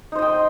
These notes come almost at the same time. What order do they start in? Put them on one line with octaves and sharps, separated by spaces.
D#4 C5 D#5 G5